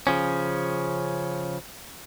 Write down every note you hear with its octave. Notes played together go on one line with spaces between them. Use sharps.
C#3 F3 C#4